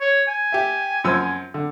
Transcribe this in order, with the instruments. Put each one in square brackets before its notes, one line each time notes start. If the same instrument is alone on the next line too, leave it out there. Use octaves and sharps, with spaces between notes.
[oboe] C#5
G#5
[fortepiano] G4 E5
F#2 F3 E6
D3